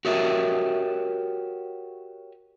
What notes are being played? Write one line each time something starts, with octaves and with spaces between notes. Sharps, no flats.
F#4 G4 A#4 C#5 D#5 E5